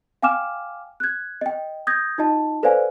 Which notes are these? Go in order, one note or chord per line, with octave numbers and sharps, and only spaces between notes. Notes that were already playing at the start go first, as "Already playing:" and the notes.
F5 G5 G#5 D6 F6 E7
F#6 G#6
D#5 G5
D#6 G6 G#6 A#6
D#4 F4 D#5 A5
A4 B4 C5 D5 F5 G#5